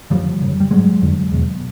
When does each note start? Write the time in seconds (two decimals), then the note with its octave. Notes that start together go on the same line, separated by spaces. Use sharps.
0.10 F#2 D3 F3 G3
0.41 F#2 C#3
0.60 G3
0.71 G#2 F#3 G#3
1.02 F2 D3
1.31 E2 B2